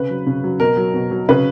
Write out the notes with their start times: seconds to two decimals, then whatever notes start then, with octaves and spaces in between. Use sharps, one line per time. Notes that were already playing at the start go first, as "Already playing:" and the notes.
Already playing: C#3 B4
0.10 F#3
0.26 C#3
0.44 F#3
0.60 B2 A#4
0.77 F#3
0.94 B2
1.11 F#3
1.29 C#3 B4